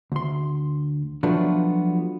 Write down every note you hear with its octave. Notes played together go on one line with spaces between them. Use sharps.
D2 C6
F3 F#3 A3 B3 D4 F4